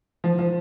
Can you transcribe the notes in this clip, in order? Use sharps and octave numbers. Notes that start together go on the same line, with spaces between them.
F3
F3